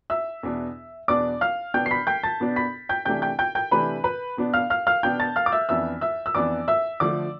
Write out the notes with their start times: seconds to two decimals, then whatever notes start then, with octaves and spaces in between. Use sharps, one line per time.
0.10 E5 E6
0.43 E2 B2 B3 D4
1.08 E2 B2 B3 D4 D5 D6
1.41 F5 F6
1.74 B2 B3 D4 G5 G6
1.86 C7
1.91 B5 B6
2.07 G5 G6
2.23 A5 A6
2.40 B2 B3 D4
2.56 B5 B6
2.89 G5 G6
3.05 C3 E3 A3 D4 G5 G6
3.22 G5 G6
3.39 G5 G6
3.55 G5 G6
3.71 C3 E3 A3 D4 B4 B5
4.04 B4 B5
4.37 B2 B3 D4
4.54 F5 F6
4.70 F5 F6
4.87 F5 F6
5.03 B2 B3 D4 G5 G6
5.19 A5 A6
5.36 F5 F6
5.46 D6
5.52 E5 E6
5.69 F2 E3 B3 D4 E5 E6
6.01 E5 E6
6.26 E6
6.35 F2 E3 B3 D4 D5 D6
6.68 E5 E6
7.00 D3 F3 A3 D5 D6